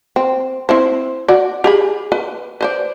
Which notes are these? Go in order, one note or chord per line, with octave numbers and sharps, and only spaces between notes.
C4
C4 E4 C5
F#4 D5
G4 G#4 B5
B4
B4 C5 D5